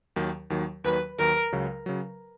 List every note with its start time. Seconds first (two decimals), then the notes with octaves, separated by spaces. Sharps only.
0.16 D#2 D#3 F#3
0.50 D#2 D#3 F#3
0.84 D#2 D#3 F#3 B4
1.18 D#2 D#3 F#3 A#4
1.52 C#2 C#3 F#3
1.86 C#3 F#3